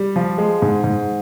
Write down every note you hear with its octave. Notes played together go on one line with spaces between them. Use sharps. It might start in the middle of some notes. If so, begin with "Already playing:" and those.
Already playing: G3
F3
G#3
G#2
G#2